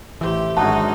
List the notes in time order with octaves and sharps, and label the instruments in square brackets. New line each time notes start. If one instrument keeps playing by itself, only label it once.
[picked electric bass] A1 E3 [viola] G4 [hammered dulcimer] C5 E5
[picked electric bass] G#1 [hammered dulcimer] F#2 D4 F#4 [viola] G#3 D#4 [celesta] A5